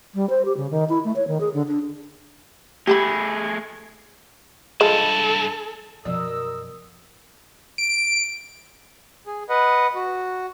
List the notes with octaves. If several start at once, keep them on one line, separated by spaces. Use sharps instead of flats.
G3
C5
G4
C#3
D#3
E4
A3
C#5
D#3
G#4
D3
D4
A3 G4 G#4 A5 B5
G2 F3 G#3 E4 A4
F#2 B2 F3 A#4 D5 D#6 E6
D7
G#4
B4 D#5 F#5
F#4